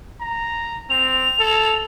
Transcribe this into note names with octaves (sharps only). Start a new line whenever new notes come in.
A#5
C4 F7
A4